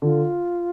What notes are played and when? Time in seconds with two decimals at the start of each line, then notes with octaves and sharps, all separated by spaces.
0.02 D3 F4